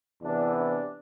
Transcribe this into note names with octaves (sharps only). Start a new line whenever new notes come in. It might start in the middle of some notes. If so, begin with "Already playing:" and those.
E2 C3 E3 B3 D4
D4